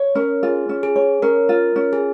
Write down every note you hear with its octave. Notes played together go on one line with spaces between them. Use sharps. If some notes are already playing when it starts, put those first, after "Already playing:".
Already playing: C#5
C#4 A#4
F4 G#4
C#4
G#4
C#5
C#4 A#4
F4
C#4
G#4